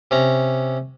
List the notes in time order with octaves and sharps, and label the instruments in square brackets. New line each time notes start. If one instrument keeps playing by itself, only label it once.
[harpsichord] C3 C#4 A#5